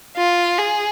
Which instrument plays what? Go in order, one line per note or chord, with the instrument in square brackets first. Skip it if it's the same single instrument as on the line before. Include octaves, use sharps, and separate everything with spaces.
[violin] F4
G#4